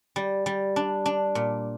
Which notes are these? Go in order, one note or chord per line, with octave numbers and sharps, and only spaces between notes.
G3
G3
D4
D4
A#2